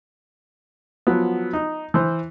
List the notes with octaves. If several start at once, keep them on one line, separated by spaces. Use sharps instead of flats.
F3 F#3 B3
D#4
E3 C5